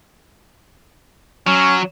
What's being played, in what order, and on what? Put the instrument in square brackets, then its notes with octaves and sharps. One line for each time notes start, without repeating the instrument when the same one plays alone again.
[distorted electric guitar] F#3 [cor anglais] C#4